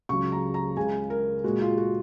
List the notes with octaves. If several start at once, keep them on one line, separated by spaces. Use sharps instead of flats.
C#2 C#3 F#3 C#6
A#5
A#5
C#2 C#3 G#3 G#5
A#4
A#2 G#3 F#4
F4
F#4